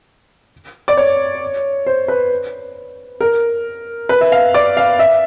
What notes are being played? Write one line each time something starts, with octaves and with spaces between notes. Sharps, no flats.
D5
C#5
C5
B4
A#4
B4
E5
F5
D5
F5
E5